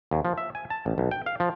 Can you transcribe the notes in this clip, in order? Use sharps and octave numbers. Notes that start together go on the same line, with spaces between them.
D#2
F3
E5
G#5
A5
A1
B1
G5
F5
F3